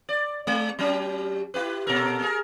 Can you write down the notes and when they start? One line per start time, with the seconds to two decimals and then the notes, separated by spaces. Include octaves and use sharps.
0.09 D5
0.47 G#3
0.79 F#3 C#4 G4
1.54 E4 G4 B4
1.87 A#2 A4 A#4
2.22 G#4 A#4